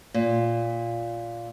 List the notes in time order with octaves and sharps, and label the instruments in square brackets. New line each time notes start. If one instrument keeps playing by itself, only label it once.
[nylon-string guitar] A#2